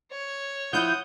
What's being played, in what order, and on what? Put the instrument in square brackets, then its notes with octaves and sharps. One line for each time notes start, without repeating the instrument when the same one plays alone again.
[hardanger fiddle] C#5
[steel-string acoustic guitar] F3 E4 F4 [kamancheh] F#5 D#6 [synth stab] G6